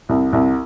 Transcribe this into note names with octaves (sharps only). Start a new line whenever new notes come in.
C2
C2